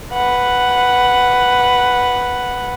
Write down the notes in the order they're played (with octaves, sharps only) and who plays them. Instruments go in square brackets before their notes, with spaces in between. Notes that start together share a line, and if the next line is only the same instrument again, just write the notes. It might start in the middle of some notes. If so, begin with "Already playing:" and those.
[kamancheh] B4 F#5